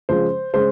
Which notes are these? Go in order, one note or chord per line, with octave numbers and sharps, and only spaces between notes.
C#3 F3 G#3 C5
C#3 G#3 C5